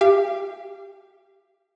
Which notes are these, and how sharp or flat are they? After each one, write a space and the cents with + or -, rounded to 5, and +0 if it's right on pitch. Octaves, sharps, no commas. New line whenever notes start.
G4 +10 F5 -30